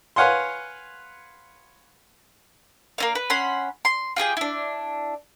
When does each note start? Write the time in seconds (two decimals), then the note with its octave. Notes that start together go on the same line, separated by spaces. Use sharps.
0.16 B4 C#5 F5 F#5 G#5 C6
2.98 A#3 C#4 F5
3.15 B4
3.30 C#4 F#5 B5 C6
3.85 C6
4.16 F4 G4 G#4 G5
4.37 D4 E4